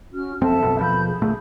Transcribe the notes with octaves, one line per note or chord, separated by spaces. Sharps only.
C#4 F#4 F6
F#1 F2 C4 A4 E5 A5
A#1 F#2 B2
D#2 B2 F3 B5 G6
G#4
D2 A#2 A3 G#4